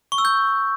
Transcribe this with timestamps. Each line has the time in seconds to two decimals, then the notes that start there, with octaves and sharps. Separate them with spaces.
0.12 C#6
0.18 E6
0.25 G6